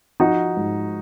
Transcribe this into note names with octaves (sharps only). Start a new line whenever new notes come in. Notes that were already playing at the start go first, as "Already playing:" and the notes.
F3 D#4 F#4
G#2